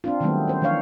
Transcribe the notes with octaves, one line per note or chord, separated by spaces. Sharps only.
C4 D4 F4
D#3 F#3 G3 A3 B3 C4
C#4 C5
E3 F3 D4 C#5 F5